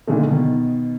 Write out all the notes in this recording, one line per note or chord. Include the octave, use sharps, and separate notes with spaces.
A#2 D3 D#3 G#3 A3
B2 D#3